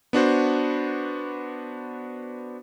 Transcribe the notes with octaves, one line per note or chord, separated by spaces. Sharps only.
B3 D4 F#4 C5